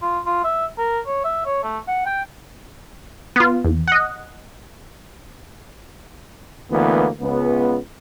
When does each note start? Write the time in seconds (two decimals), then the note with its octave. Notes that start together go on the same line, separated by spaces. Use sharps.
0.02 F4
0.26 F4
0.44 E5
0.78 A#4
1.07 C#5
1.24 E5
1.46 C#5
1.63 A3
1.88 F#5
2.06 G5
3.36 B3 F4
3.65 E2
3.88 D#5 F#5
6.72 D2 E3 A#3 B3
7.21 C#2 B3